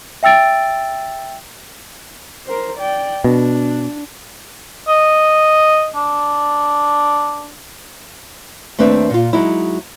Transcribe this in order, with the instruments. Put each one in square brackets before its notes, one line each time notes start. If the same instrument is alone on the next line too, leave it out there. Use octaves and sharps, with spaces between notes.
[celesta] E5 G5 E6 A6 D7
[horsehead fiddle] A#4 C5
D5 G5
[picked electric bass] B2 [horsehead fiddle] D4
[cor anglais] D#5
D4
[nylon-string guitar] D#2 A3 C4 D4 B4 E5
A#2 F4
F#3 G#3 D#4 E4